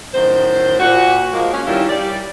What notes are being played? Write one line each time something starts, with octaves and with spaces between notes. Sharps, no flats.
F#2 A2 D#3 C5
A#2 F#4
F3 G#3 A#3
C#4
G2 D#3 G3 C#4 E4 F4
G3 D5